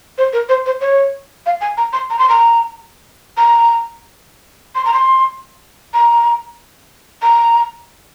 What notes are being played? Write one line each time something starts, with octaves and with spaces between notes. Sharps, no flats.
C5
A#4
C5
C5
C#5
F5
G#5
A#5
C6
A#5
C6
A#5
A#5
C6
A#5
C6
A#5
A#5